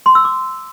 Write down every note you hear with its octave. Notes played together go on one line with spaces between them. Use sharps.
C6
E6
D6